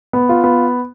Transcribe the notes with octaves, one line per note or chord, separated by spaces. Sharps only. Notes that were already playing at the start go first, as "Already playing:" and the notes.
B3
F4
B3